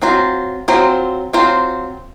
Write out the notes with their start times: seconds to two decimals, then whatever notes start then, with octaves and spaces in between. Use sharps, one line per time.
0.02 F#3 C4 F4 C5
0.68 F#3 C4 F4 C5
1.33 F#3 C4 F4 C5